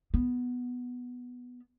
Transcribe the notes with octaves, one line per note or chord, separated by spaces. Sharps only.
B3